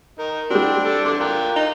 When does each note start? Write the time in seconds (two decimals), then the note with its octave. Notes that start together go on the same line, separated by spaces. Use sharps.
0.19 D#4 A#4
0.50 G3 C4 D4 F#4
0.85 G4 A4
1.05 D3 E3 C6 D6
1.20 F4 A#4 G5 F#6
1.56 D#4